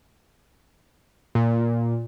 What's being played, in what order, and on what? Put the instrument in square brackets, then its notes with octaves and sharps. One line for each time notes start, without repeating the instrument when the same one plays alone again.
[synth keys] A#2